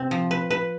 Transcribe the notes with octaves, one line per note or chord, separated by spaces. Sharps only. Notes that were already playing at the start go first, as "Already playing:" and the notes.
Already playing: C3 C4
F3
B4
B4